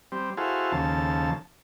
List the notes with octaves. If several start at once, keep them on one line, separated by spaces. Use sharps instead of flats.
G3 C4
E4 F#4 G#4 A4 C5 F5
D#2 C#3 F3 A4 A5